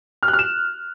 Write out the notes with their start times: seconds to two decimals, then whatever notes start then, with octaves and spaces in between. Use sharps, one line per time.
0.23 F6
0.28 F#6
0.33 F6
0.39 E7